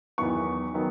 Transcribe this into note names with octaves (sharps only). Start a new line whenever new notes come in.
E2 D#3 F#3 B3 C#6
D#3 F#3 B3